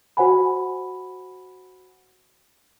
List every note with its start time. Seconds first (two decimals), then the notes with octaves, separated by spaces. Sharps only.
0.17 F#4 C5 F#5 G#5 B5